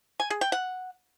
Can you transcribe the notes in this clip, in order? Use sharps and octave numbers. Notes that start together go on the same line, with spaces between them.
G#5
G#4
G5
F#5